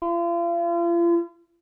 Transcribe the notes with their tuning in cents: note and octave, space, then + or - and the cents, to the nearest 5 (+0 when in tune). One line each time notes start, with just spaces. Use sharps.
F4 -40